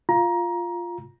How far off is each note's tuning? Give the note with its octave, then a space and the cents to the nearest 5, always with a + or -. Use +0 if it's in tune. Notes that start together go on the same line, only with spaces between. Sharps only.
F4 +0 A#5 +20